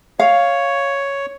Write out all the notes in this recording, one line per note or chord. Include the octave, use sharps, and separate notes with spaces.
C#5 F5